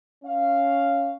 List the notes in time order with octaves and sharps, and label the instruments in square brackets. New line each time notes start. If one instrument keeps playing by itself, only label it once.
[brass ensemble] C#4 F5